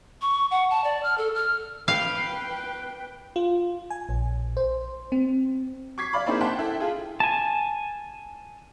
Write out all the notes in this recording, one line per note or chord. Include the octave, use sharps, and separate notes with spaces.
C#6
F#5
A5
D5
F6
A4
F6
B4 F5 G5
F4
G#5
A#1
C5
C4
C#6 D6 G#6 B6 C7
D5 F5 B5 D6
A#3 C4 D#4 E4 G#4 C5
F#5 G5 A5 C6 B6
E4 A4 G5
F4 G#4
G#5 A5